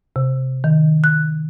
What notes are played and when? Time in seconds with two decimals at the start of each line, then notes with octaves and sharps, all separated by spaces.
0.16 C3
0.64 D#3
1.04 F#6